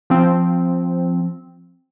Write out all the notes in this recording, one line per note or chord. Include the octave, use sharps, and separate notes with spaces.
F3 C4